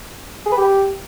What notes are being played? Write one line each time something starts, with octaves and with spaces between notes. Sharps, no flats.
G#4
B4
G4